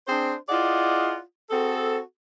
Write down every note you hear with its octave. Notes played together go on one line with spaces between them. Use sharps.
C4 D4 G#4 C5
E4 F4 G#4 D5 D#5 F#5
C4 F#4 G#4 A4